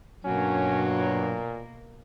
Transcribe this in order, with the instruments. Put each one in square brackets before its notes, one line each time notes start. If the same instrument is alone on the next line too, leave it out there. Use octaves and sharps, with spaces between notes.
[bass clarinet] G2 [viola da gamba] B2 A#3 A#4 [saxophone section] F#3 [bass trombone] C#4
[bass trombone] A#2